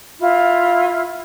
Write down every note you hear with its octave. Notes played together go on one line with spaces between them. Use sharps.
E4 F4